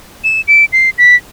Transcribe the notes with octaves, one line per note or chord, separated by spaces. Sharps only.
E7
D7
C7
B6